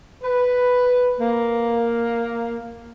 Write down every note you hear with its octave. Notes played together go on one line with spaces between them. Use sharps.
B4
A#3